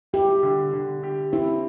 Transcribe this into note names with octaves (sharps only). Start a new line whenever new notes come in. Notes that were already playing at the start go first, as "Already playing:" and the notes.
E4 G4
D3
D3
G4
C4 E4